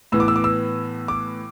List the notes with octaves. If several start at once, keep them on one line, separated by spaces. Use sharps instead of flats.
A2 E3 B3 E6
D6
E6
D6
E6
D6